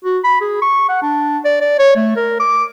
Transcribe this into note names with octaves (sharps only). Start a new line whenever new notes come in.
F#4
B5
G#4
C#6
F#5
D4
D5
D5
C#5
A3
A#4
D6